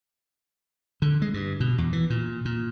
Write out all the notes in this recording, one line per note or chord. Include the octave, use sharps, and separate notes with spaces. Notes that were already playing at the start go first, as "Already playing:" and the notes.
D3
G#3
G2
B2
E2
E3
A#2
A#2